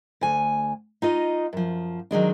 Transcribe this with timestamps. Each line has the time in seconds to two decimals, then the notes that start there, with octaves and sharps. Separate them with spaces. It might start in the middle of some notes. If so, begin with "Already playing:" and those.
0.21 D2 G#5
1.02 D#4 F4 D#5
1.53 F#2 F3
2.11 D#3 F#3 G#3 D4